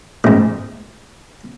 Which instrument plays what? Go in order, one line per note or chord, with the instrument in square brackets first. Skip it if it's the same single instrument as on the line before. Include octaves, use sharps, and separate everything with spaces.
[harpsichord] A1 G#2